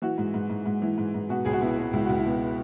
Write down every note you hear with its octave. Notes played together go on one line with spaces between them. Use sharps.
E3 F#4
G#2
G#2
G#2
G#2
E3
G#2
G#2
B2 F#4
C#2 G#4
F#4
B2 E4
B2
C#2 E4
C#2 F#4
E4
B2